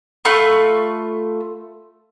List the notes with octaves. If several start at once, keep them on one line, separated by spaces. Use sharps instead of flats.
A3 F4 B5 C#6